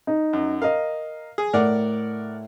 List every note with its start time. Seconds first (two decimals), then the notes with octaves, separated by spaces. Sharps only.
0.07 D#4
0.33 F#2
0.62 A#4 D#5 F5
1.38 G#4
1.53 A2 A#4 D5 F#5